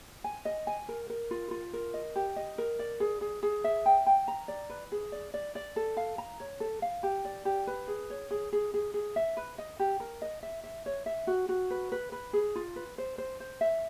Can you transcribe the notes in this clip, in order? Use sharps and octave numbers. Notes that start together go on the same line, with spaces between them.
G#5
D#5
G#5
A#4
A#4
F4
F4
A#4
D#5
G4
D#5
A#4
D5
G#4
G#4
G#4
E5
G5
G5
A#5
D5
B4
G#4
D5
D5
D5
A4
F5
A#5
C#5
A4
F5
G4
D5
G4
B4
G#4
C#5
G#4
G#4
G#4
G#4
E5
B4
D#5
G4
A#4
D#5
E5
E5
C#5
E5
F#4
F#4
B4
B4
B4
G#4
F4
B4
C5
C5
C5
E5